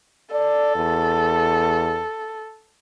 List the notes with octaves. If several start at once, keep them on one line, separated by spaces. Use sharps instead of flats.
A4 D5
E2